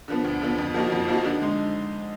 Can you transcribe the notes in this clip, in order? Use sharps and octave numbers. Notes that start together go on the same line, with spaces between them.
D3 F3 B3
D2
D3 F3 B3
F2
F3 A#3 D#4 F#4
F2
F3 A#3 D#4 F#4
D3
G#3 D#4